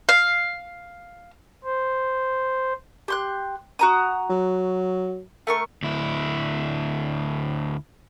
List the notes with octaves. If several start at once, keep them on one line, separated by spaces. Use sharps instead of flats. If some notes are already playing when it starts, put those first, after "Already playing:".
F5
C5
G4 C6 F#6
F#4 A#5 D#6
F#3
A3 A#4 C#6
D2 E4